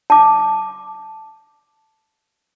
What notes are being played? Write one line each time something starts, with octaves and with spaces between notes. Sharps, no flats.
A5 D6